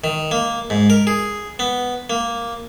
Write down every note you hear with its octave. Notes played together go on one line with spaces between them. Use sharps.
D#3
A#3
G#2
A#4
G#4
B3
A#3